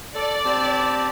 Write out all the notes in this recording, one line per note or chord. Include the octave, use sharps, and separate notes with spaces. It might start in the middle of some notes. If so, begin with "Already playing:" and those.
A4 D5
C4 G4 A5